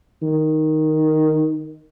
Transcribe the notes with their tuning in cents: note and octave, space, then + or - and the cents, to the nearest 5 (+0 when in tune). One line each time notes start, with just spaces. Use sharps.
D#3 +0